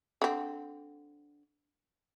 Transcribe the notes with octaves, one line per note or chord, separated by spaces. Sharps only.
D3 C4